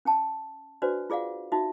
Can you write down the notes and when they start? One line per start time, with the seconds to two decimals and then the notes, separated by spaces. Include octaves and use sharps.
0.05 C#4 G5 A5
0.82 D4 F#4 B4 C5 D5
1.10 F4 G#4 D5 F5 F#5
1.52 D#4 F#4 E5